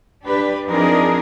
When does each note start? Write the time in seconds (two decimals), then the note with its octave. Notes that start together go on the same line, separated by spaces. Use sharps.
0.25 D4 G4 B4
0.67 F3 C4 D4 D#4 G#4 A#4